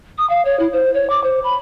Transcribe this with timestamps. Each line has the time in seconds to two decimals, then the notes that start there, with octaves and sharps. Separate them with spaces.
0.18 D#6
0.30 F5
0.45 C#5
0.59 E4
0.73 C5
0.94 C#5
1.10 D6
1.24 C5
1.44 B5